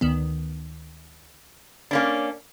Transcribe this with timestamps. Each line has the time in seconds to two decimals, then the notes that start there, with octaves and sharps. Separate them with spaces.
0.01 D2 D#3 B3
1.91 A#3 C#4 D4